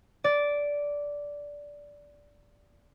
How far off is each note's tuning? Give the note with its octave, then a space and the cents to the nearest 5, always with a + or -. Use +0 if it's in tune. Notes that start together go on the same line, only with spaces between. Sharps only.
D5 -10